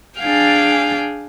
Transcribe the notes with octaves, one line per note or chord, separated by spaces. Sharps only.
D4 G#4 F5 G5 G#5